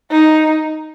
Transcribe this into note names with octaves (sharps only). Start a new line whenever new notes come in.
D#4